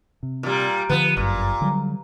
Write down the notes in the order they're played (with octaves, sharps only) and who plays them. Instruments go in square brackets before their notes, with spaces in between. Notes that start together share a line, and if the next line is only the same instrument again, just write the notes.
[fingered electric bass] C3
[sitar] A#2 G3
[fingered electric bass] D3 D#3 F3 [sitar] B3
[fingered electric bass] G1 F#2 [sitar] A#2
[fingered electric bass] D3 F#3 G3